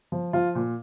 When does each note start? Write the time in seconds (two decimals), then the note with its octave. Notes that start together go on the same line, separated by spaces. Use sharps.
0.12 F3
0.33 F3 F4
0.55 A#2